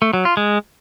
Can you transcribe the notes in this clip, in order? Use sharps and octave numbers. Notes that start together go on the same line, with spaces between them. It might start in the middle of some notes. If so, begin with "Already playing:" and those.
A3
F#3
F4
G#3